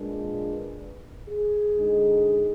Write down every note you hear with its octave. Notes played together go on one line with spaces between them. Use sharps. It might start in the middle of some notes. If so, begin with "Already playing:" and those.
Already playing: A#2 G#3 D4 B4
G#4
D3 G#3 D#4